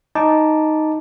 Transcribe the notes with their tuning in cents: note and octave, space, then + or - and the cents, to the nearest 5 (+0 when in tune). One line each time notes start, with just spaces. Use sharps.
D#4 +0 A5 -5 D6 +0